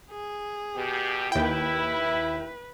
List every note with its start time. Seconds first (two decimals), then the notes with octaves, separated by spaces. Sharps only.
0.11 G#4
0.76 B2 G4
1.32 D#2 E4 B4 G5